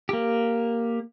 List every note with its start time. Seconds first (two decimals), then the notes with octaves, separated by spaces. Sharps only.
0.09 A#3 G4